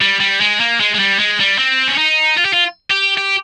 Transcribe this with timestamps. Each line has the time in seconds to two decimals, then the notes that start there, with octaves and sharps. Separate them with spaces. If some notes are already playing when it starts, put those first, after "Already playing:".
0.01 G3
0.20 G3
0.41 G#3
0.60 A#3
0.80 G#3
0.94 G#3
0.99 G3
1.19 G#3
1.40 G3
1.58 C4
1.88 C#4
1.98 D#4
2.37 F4
2.45 G4
2.53 F4
2.90 G4
3.18 G4